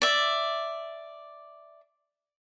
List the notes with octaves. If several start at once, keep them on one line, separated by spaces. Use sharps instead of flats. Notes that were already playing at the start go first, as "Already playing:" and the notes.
D5 E5